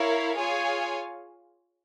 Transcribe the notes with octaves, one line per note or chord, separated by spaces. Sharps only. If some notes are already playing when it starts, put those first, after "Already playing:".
Already playing: E4 A#4 C#5 F5
F4 G#4 C#5 F5 G#5